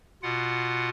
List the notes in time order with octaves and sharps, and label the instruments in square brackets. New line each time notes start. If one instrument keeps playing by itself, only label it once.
[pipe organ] B2 F4 F#5